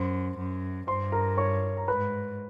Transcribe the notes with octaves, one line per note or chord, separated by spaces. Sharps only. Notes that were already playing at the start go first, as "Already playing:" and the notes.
Already playing: F#2 C5 C6
F#2
G2 C5 C6
A#4 A#5
C#5 C#6
A#5
G#2 B4 B5